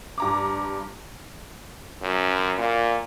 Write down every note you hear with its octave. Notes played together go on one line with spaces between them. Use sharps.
G2 A#5 D6
F#2
A#2